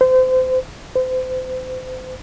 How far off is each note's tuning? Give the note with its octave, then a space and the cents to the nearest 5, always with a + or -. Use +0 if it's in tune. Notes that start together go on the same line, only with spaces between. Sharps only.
C5 -30
C5 -35